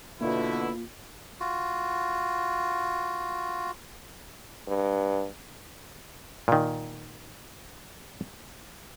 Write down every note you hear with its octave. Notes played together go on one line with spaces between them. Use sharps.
B2 D3 A#3 E4 F4
F4 F#4
G2
A#2 D#3